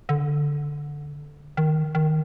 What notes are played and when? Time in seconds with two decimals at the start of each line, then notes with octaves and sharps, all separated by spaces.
0.09 D3
1.57 D#3
1.95 D#3